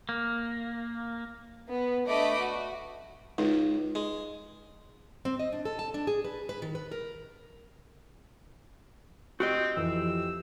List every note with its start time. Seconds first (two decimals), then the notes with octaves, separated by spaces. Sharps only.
0.09 A#3
1.68 B3
2.06 A3 D4 B4 D#5 B5 D6
2.38 F#4
3.38 C#2 D#4
3.95 G#3
5.25 C4
5.39 D#5
5.52 D4
5.65 A4
5.79 A5
5.94 D4
6.07 G#4
6.25 B4
6.49 B4
6.62 D#3
6.75 B4
6.91 A#4
9.40 C4 F#4 G4 D#5
9.77 F2 E3 E6